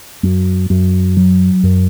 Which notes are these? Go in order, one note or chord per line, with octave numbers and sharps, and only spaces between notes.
F#2
F#2
F#3
F#2